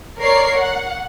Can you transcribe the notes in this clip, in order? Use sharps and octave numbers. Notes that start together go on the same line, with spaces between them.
A#4 C#5 D5 C7
F#5